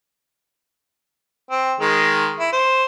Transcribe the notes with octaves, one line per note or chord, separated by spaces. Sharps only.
C4
D#3 G#3
E4
C5